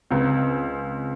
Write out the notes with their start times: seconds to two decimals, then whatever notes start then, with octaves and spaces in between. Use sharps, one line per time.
0.11 C#2 C4